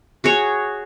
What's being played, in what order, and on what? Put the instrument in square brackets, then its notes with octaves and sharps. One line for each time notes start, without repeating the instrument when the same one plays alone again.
[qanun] F#4 G#4 C#5